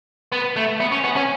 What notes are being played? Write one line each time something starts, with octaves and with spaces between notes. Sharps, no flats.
B3
A3
B3
C#4
B3
C#4